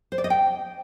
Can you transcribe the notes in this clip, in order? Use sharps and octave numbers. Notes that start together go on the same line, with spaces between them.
C5
D5
D#5
G5